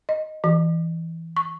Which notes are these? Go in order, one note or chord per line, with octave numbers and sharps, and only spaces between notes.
D#5
E3
C#6